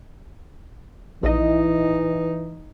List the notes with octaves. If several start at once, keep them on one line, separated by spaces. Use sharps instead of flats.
A#1 E3 D#4 D#5